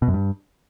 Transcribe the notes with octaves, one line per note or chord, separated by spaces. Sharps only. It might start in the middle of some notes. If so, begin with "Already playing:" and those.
B2
F#2
G2